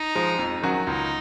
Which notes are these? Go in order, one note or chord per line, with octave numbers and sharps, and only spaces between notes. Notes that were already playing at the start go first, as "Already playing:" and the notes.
Already playing: D#4
F3 G#3
F2
D#3 F#3 C#4 F#4
C#2 D#4